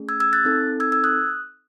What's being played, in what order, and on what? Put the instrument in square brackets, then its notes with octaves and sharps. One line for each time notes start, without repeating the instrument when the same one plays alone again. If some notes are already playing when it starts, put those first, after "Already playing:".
Already playing: [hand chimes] A3 C#4 G#4
E6 G#6
E6 G#6
F#6 A6
C4 D#4 A4
E6 G#6
E6 G#6
D#6 F#6